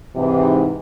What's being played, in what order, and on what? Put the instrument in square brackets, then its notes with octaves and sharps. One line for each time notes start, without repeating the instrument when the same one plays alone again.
[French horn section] G#2 C3 E3